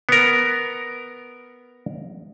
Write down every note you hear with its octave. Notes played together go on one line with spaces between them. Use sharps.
B3 A#4